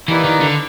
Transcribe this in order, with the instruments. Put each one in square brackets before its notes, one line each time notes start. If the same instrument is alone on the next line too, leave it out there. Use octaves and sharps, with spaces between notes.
[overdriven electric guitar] E3 [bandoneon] A#3 D#4 G4 B4 D5
[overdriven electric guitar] D#3
D3